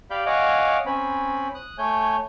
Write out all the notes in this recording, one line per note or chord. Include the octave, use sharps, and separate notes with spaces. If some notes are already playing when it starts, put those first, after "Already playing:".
G4 D5 F5 B5 G6
C#5 D#5 F5 F#5 G#5 D6
C4 C#4 G#5 B5
D#6 F#6
A3 C#5 G#5 G6